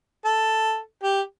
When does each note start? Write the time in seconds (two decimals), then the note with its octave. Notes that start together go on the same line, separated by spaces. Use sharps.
0.25 A4
1.03 G4